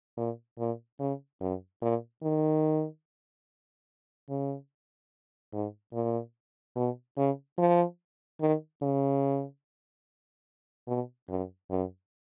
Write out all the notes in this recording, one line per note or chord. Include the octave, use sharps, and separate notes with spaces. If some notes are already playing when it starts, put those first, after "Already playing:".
A#2
A#2
C#3
F#2
A#2
D#3
C#3
G#2
A#2
B2
C#3
F3
D#3
C#3
B2
F#2
F#2